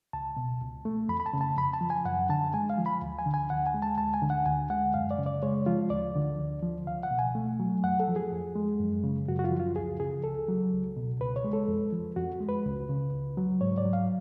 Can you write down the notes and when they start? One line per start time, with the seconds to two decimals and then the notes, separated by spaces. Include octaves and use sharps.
0.13 C#2 A5
0.37 B2
0.61 C#2
0.85 A3
1.09 F2 B5
1.20 B5
1.26 A5
1.33 C#3
1.41 A5
1.57 F2 B5
1.73 A5
1.81 F3
1.90 G#5
2.05 F#2 F#5
2.29 D3 A5
2.54 G#3 G#5
2.70 F5
2.78 F3
2.86 B5
3.02 D2
3.19 G#5
3.26 D3
3.34 G#5
3.50 D2 F#5
3.67 G#5
3.74 G#3
3.82 A5
3.98 D2 A5
4.14 G#5
4.22 D3
4.30 F#5
4.46 D2 G#5
4.70 G#3 F#5
4.94 F#2 F5
5.11 D5
5.18 C#3
5.26 D5
5.42 G#3 C#5
5.66 F3 F4
5.90 D2 D5
6.15 D3
6.39 D2
6.62 F3
6.87 C#2 F5
7.03 F#5
7.11 B2
7.19 G#5
7.35 A3
7.60 F#3
7.84 F2 F#5
8.00 A4
8.08 F3
8.16 G#4
8.32 F2
8.56 G#3
8.80 F#2
9.04 C#3
9.28 F#2 F#4
9.39 F#4
9.44 F4
9.52 F3
9.59 F4
9.76 C#2 G#4
10.00 C#3 G#4
10.24 C#2 A4
10.48 F#3
10.73 C#2
10.97 B2
11.20 C#2 B4
11.36 C#5
11.44 G#3
11.53 A4
11.68 F2
11.92 F3
12.16 F2 F#4
12.40 G#3
12.49 B4
12.66 C#2
12.89 C#3
13.13 C#2
13.37 F#3
13.61 G#2 C#5
13.78 D5
13.85 F#3
13.93 F5